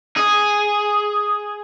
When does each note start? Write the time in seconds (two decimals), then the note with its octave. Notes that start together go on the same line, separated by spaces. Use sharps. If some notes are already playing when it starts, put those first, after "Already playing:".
0.17 G#4